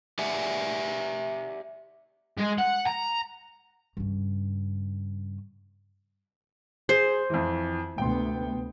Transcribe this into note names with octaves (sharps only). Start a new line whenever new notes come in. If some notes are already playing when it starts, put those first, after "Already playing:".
G4 D5 E5 F#5 G#5
G#3
F#5
A#5
G2 C#3
G#4 C5
F2 E3
D2 C3 B3 G5 C6